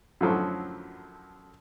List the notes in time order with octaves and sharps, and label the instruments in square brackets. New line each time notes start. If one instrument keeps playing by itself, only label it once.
[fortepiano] F#2 A2 D3 F3 F#3